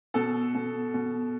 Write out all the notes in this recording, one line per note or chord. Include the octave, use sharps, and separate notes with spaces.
B2 A4
B2
B2